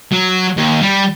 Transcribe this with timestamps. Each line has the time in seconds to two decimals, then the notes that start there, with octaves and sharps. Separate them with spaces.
0.12 F#3
0.57 D#2
0.82 G3